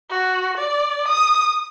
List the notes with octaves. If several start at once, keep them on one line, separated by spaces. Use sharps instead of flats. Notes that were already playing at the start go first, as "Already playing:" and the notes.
F#4
D5
D#6